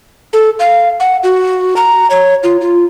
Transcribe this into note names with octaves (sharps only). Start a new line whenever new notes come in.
A4
F5
F#5
F#4
A#5
C#5
F4
F4